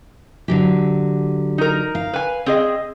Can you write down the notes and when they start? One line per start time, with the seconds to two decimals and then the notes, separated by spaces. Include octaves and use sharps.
0.48 D3 F#3 G4
1.58 D#4 A#4
1.95 F5
2.14 B4 G#5
2.46 C4 G#4 D#5